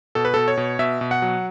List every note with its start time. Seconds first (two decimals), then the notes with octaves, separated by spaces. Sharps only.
0.15 B2 A4
0.25 B4
0.34 B2 A4
0.48 C#5
0.57 B2
0.79 B2 E5
1.01 B2
1.11 F#5
1.22 F#3